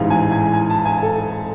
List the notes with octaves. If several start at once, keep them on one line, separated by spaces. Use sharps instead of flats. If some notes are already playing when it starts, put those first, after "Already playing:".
Already playing: A1 G#2 E3 F5
G#5
G#5
G#5
A5
G#5
A4